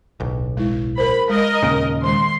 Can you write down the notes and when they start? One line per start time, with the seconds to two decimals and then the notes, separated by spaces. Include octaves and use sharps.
0.20 D1 B1
0.57 G#3 E4
0.98 A#4 C5 B5
1.29 G#3 A#4 D#5
1.63 D#2 A#2 C#3
2.03 D#3 G#3 C6